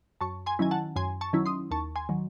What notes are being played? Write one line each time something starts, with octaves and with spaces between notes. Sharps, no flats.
F#2 A5 C#6
G#5 C6
D#3 F#3 C#4 E4 G#5
F#5 A5
F#2 G#5 C6
A5 C#6
D#3 F#3 C#4 E4
C6 D#6
D#2 A5 C#6
G#5 C6
D#3 F#3